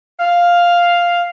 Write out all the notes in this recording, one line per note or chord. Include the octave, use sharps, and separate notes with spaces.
F5